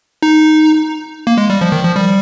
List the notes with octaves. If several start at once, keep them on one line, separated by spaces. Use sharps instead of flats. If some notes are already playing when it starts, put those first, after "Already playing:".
D#4
A#3
G#3
G3
F3
D#3
F3
G3